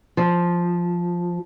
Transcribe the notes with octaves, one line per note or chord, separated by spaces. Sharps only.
F3